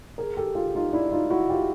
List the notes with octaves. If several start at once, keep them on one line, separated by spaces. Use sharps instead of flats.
G#4 A#4
G4 A4
F4 G4
D#4 F4
D4 E4
D#4 F4
E4 F#4
F4 G4